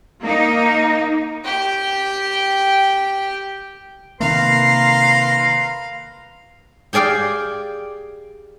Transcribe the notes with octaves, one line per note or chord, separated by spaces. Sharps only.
A#3 D#4
G4 G5
C3 D#3 A#3 A#4 B4 F5 A#5 C6
G4 G#4 D5 F5 G5